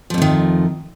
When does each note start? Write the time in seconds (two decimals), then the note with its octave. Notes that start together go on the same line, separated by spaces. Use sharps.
0.10 F3
0.14 F2
0.18 A3
0.22 D#3